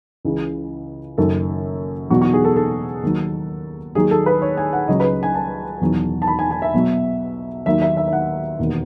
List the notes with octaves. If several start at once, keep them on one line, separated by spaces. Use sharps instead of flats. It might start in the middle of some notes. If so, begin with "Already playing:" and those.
C#2 C#3 E3
F#1 F#2 D#3 F#3 A4
E2 B2 F#3 F#4
F#4
G#4
A4
A4
D#2 D#3 F#3
D#2 D#3 F#3 G#4
A4
B4
C#5
G#5
F#5
C#2 C#3 F#3 D#5
B4
G#5
A5
E1 E2 D#3 F#3
A5
B5
G#5
G#5
E5
B1 B2 F#3
D#2 D#3 F#3 E5
E5
E5
E5
F#5
E1 D#2 D#3